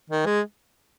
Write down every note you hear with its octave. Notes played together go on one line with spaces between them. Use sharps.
D#3
G#3